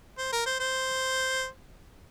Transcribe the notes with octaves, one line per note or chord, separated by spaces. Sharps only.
C5
A#4
C5
C5